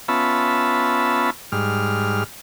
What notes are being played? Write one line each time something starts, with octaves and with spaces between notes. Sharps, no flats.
B3 C#4 F4 E5 A5 B5
G#2 G3 F6